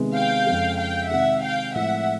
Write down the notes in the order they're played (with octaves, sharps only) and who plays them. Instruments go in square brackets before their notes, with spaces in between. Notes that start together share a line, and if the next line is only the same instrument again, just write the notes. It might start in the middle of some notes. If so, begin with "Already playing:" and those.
Already playing: [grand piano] C3 D#3 G#3 B3
[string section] F5 G5
[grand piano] F2 C#3 F3 G#3
[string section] F5 G5
[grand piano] C3 D#3 G#3 [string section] E5 F#5
[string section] F5 G5
[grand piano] A2 F3 G#3 C4 E4 [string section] E5 F#5